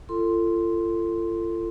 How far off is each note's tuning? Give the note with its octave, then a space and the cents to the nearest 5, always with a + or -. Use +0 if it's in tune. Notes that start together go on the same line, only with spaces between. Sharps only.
F4 -35 A4 +25 C6 +0